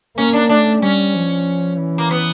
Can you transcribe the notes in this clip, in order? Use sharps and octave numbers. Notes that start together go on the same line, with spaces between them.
A#3 C#4
D4
A3 D4
G3 C#4
F3
E3
A#3
B3